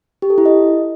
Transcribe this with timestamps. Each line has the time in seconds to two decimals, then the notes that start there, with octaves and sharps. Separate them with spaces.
0.22 G4
0.30 A4
0.38 E4
0.46 D#5